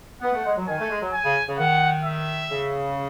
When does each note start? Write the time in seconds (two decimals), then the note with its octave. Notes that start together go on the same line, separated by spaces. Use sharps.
0.21 B3 F#5
0.33 A3
0.45 G#3
0.57 F#3
0.67 D#3 G#5
0.79 A3
0.90 G#3
1.01 F#3
1.13 G#5
1.24 C#3
1.47 C#3
1.58 D#3 F#5
2.04 E5
2.49 C#3